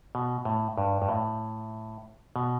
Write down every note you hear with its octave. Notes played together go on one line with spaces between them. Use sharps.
B2
A2
G2
G2
A2
B2